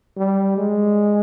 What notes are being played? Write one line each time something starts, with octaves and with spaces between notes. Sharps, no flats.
G3
G#3